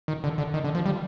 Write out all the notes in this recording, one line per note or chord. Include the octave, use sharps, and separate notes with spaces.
D#3
D3
D3
D#3
D3
F3
G3